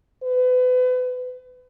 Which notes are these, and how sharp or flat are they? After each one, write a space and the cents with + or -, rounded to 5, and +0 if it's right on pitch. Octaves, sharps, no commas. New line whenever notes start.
B4 +35